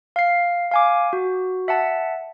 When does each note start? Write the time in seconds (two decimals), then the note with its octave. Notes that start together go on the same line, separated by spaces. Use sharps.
0.16 F5 C7
0.71 F5 G#5 D6
1.13 F#4
1.68 E5 F#5 A5